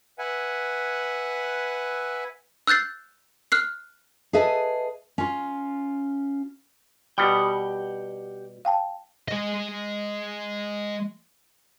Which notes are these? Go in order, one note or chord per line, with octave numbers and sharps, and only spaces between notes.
B4 E5 F#5 G#5
E6 F#6 G6 A6 C7
F6 F#6 C7
G#4 A4 B4 D#5 E5 A5
C#4 F4
B2 G3 G4 F#5 G5
F5 G5 A5
G#3 D#5